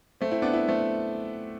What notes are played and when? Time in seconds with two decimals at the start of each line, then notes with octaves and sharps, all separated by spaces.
0.21 A3 C4
0.31 C4 E4
0.42 B3 D4
0.53 C4 E4
0.68 A3 C4